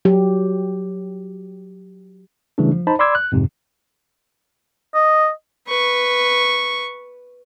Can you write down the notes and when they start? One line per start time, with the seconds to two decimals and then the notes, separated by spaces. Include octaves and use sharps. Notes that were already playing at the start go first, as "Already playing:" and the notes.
0.05 F#3 G4
2.58 C#3 E3 G3 A3 D4
2.73 F3
2.87 D#4 C5 A5 B5
2.99 D5 B5 C6 D6 E6 G#6
3.15 F#6
3.32 F2 G#2 C3
4.94 D#5
5.68 B4 C#6